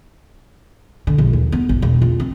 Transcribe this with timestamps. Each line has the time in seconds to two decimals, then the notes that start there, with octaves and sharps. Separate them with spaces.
1.07 D3
1.18 A#1
1.33 D#2
1.52 B3
1.69 G#1
1.82 E1
2.02 F4
2.20 C4